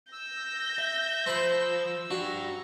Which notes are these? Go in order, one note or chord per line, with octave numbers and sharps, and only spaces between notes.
E6 G6 A#6
E5
F3 C5 A5 B5
D4 F#4 G4 A#5